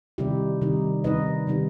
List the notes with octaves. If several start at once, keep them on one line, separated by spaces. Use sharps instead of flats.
C3 D#3 G3 D#4 E4 G4
C3 D#3 G3 D#4
C3 D#3 G3 D#4 B4 D#5
C3 D#3 G3 D#4